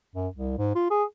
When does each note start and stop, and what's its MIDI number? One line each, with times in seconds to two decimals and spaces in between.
0.15 0.27 42
0.35 0.58 36
0.58 0.75 44
0.75 0.89 65
0.90 1.04 68